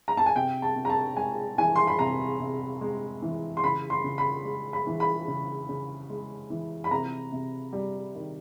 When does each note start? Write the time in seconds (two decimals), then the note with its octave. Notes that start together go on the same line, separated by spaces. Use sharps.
0.08 A#5
0.17 A5
0.26 G#5
0.36 C3 G5
0.62 A5
0.76 C3
0.85 A#5
0.90 A5
1.17 G#3 G#5
1.58 E3 G#5
1.76 C6
1.87 B5
1.99 C3 A#5
2.40 C3
2.81 G#3
3.22 E3
3.57 C6
3.64 C#3 B5
3.90 C6
4.04 C#3
4.18 B5
4.45 G#3
4.73 B5
4.87 E3
5.00 B5
5.28 C#3
5.69 C#3
6.10 G#3
6.50 E3
6.84 B5
6.91 C3 A#5
7.32 C3
7.73 G3
8.15 D#3